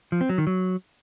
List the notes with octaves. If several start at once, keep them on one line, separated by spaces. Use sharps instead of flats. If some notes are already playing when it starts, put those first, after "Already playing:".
F3
C4
F#3
D#3
F#3